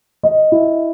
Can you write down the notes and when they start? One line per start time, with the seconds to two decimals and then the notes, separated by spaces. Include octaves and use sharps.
0.23 D#5
0.52 E4